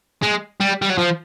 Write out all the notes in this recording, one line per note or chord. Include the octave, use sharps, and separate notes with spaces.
G#3
G3
G3
F#3
F3